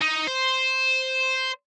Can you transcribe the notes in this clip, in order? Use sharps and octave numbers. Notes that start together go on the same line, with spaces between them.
D#4
C5